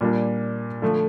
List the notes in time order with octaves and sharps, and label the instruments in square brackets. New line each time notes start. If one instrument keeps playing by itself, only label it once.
[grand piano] A#2 G3 A#3 D4
D3 F3 A3